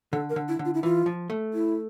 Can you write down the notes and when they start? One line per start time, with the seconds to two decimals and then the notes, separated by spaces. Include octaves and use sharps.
0.12 D3 A4
0.30 A#4
0.36 D3
0.48 E4
0.59 D3
0.65 F4
0.74 E4
0.83 E3 F4
1.06 F3
1.30 A3
1.54 E4